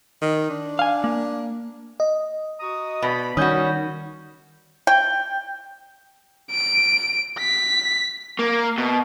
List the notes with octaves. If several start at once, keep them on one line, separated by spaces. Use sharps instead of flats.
D#3
D4
F5 G#5
A#3
D#5
F#4 A#5 D#6
B2 D5 A5 B5
D#3 G3 C#4 F#4 D#6 G6
G5
D7
B6
A#3
B2